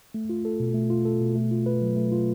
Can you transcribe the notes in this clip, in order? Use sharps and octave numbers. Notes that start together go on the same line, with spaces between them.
A3
F4
A4
B2
A3
F4
A4
B2
A3
F4
B4
F#3
A3
F4